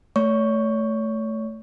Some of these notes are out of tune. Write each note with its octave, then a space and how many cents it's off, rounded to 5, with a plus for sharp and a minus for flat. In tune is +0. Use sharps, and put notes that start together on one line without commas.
A3 +0 C#5 +30 C#6 +5